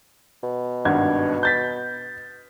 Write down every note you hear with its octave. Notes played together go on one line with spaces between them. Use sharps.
B2
G#1 G2 G#6
G6 A6 B6